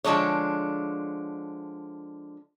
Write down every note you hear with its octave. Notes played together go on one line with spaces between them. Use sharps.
D3 F3 G#3 D4 C#5